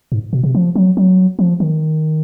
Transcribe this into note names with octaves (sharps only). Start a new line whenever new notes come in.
G#2
B2
C3
F3
F#3
F#3
F3
D#3